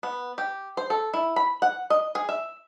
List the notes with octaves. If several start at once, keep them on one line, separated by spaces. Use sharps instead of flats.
B3
G4
C5
A4
E4
B5
F#5
D#5
G#4
E5